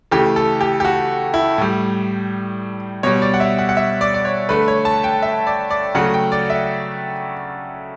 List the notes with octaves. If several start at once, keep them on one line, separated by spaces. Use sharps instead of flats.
C#3 E3 A3 G4
A4
G4
G4
F#4
E4
A2 G3
B2 G3 C#5
D5
F#5
E5
F#5
F#5
E5
D5
D5
C#5
D3 A3 B4
C#5
A5
G5
E5
D5
D5
C#3 F#3 A3 F#5
G5
D5
E5